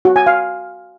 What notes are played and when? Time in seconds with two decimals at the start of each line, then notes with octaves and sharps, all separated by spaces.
0.05 F#4
0.16 G#5
0.27 F5